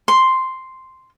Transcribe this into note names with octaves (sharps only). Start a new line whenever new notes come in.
C6